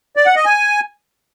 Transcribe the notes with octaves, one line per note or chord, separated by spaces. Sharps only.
D5
F#5
D#5
G#5